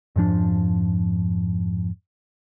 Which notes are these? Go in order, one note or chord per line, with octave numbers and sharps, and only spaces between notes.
F2 G#2 F3 D4